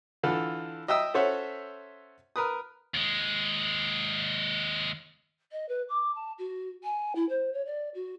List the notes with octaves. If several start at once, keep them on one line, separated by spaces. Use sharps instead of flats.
D3 E3 F4 A4
D#5 E5 G5 D#6 E6
C#4 A4 C5 C#5 E5 F#5
A#4 B4 D#6
D#2 G#3
D#5
B4
D6
A5
F#4
G#5
E4
C5
C#5
D5
F#4